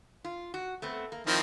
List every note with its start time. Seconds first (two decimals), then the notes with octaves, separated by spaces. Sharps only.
0.24 F4
0.54 F#4
0.82 A3 B3 C4
1.12 A#3
1.27 D#3 F3 C4 E4